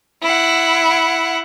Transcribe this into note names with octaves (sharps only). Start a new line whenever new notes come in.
E4 F#5